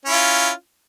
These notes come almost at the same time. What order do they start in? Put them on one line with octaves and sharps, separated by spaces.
C#4 E4 F4